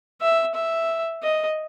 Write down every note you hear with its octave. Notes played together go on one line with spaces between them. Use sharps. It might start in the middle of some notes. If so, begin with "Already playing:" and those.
E5
E5
D#5